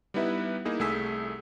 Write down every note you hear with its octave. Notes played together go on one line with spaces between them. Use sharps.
G3 B3 D#4 E4 B4 E5
A#3 D#4 E4 G#4
C2 A3 G#4 E6 B6